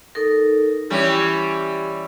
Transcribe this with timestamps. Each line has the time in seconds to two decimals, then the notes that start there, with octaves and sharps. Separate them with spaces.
0.15 D#4 A4 A#4
0.90 E3 G3 C#4 G4